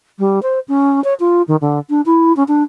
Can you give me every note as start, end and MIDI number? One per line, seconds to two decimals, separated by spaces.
0.19 0.39 55
0.42 0.59 72
0.68 1.02 61
1.04 1.14 73
1.20 1.42 65
1.48 1.56 51
1.61 1.79 50
1.90 2.01 62
2.06 2.35 64
2.36 2.43 61
2.48 2.63 62